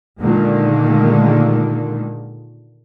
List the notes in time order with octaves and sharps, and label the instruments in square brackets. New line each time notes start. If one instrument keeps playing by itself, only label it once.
[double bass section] A#2 D3 D#3 G#3 A#3